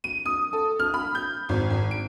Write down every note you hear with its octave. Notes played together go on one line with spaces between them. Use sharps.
D#7
D#6
A4
F6
B5
G6
G#1
G#1
D7